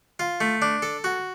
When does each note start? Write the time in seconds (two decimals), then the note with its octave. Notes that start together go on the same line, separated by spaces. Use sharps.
0.19 F4
0.41 A3
0.62 D4
0.82 A4
1.04 F#4